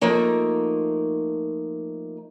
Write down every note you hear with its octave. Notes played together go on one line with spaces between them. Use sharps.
F3 A3 A#3 D#4